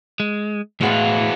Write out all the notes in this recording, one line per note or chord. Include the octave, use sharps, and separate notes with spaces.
G#3
A2 E3 G#3 B3 F4 F#4